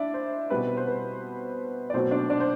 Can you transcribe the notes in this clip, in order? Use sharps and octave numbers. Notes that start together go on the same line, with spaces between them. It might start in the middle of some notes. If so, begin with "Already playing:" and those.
Already playing: D4 E4 D5 E5
C5
B2 G3 C4 B4
C5
B4
D5
B2 F#3 A3 C4 C5
D4 D5
D4 D5
C5